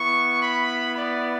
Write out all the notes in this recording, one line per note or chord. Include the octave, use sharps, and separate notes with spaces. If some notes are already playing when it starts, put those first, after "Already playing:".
Already playing: B3 E4 C#6
B5
D5